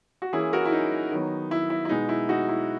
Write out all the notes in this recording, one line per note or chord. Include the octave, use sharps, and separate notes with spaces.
F#4
E3 A#3 C#4 E4 G#4
F#4 A#4
E4
D#4
D#3 F#3 B3
E4
E4
E4
B2 G#3 B3 D#4
E4
D#4 F#4
E4